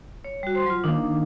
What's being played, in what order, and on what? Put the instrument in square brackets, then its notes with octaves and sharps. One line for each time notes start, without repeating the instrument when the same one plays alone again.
[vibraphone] C#5
G3 F#4
C5 C6
F#3 F4
[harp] D#3 A#3 [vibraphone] D4